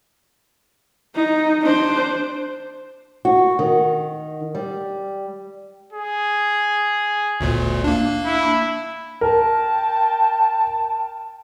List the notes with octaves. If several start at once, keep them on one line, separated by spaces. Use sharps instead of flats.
D#4
D4 C5
F#4
D#3
G3
G#4
G1 D2 A#2
A#3 D4
E4
A#4 G5 A5